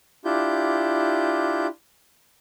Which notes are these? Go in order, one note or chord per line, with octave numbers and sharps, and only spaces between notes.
D4 E4 F4 G4 G6